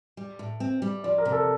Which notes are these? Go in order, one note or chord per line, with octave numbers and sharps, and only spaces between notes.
G3
A2
C4
G3
F3 D5
A#4
C3
A4